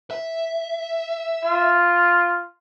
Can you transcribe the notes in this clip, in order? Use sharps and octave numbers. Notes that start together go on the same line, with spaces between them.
E5
F4